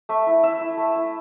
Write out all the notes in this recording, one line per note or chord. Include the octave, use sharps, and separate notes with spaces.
A3 E5
E4
E4 E5
E4
A3
E4